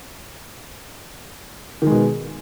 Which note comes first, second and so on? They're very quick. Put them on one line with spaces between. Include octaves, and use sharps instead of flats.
D#3 G#3 B2